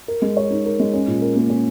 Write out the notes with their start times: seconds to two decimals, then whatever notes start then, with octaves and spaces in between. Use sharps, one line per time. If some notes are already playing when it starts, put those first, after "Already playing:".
0.08 A#4
0.22 G#3
0.37 C#5
0.50 D#4
0.65 A#4
0.80 G#3
0.93 C#4
1.08 A#2
1.22 A#4
1.36 A#3
1.50 C#4